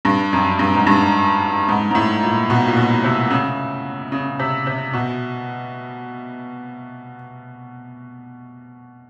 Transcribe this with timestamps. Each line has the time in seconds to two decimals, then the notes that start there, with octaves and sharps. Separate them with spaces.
0.05 G2
0.33 F#2
0.59 G2
0.75 G#2
0.87 G2
1.69 G#2
1.91 G#2
1.95 A2
2.23 A#2
2.50 B2
2.67 A#2
2.77 B2
3.04 C3
3.30 C#3
4.12 C#3
4.39 C3
4.67 C3
4.93 B2